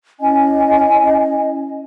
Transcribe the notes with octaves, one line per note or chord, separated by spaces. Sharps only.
C#4 E4 D#5 G#5